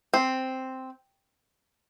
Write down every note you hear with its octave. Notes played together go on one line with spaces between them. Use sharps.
C4